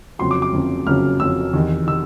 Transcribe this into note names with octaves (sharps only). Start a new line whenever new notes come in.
F#1 F2 C#3 F#3 C6
D6
D6
F#1 F2 C#3 F#3
F#1 F2 C#3 F#3 F6
F#1 F2 C#3 F#3 E6
E2 C3 D#3
C3 D#3 E6